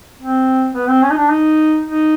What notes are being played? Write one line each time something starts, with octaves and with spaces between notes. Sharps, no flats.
C4
B3
C4
C#4
D#4
D4
D#4
D#4